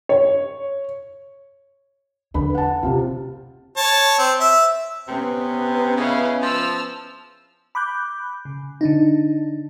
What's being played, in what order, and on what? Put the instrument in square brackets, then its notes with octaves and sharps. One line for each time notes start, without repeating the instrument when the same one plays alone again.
[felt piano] C#5
[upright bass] E2 [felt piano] D3 B4 B5
[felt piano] F#5 A5
[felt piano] C3 F4 [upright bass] D4
[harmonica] C#5 A5
C4
E5
[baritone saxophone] C3 [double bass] B3 C#4 [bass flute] B4
[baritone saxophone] C#3 [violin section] E4 D#5 F5
[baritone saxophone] F3 [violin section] A5 E6 F6
[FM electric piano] B5 D6 F#6 G6
C#3
D3 D4 D#4